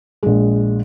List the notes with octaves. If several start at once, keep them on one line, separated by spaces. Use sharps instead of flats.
A#1 G#3